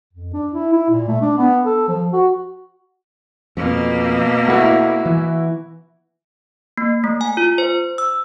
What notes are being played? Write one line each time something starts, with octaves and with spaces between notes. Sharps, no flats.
F2
D4
E4
E4
A#2
A3
D4
B3
A4
F3
F#4
F2 B2 A#3
A3 E4 F#4
E3
A#3
A3
G#5
F4
C5
E6